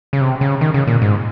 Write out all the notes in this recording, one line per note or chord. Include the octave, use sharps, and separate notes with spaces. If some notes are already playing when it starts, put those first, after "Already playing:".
C#3
C3
C#3
D#3
C#3
A#2
G#2